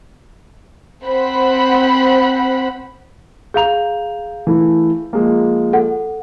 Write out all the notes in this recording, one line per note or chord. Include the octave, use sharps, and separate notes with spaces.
C4 C5 F#5 B5
G#4 F5 A#5 G6 F7
E3 A3 E4
F3 G#3 A#3
A4 F#5